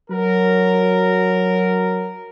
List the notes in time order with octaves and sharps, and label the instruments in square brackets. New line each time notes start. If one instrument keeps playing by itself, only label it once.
[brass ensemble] F#3 A#4